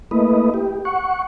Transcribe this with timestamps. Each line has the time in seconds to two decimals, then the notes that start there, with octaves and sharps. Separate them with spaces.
0.11 A3 A#3 E4 B4 D#5
0.54 G4
0.85 F#5 C#6